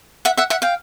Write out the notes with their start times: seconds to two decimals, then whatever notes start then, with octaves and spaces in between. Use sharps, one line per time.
0.25 E5 F#5
0.37 E5 F#5
0.50 E5 F#5
0.62 F5 G5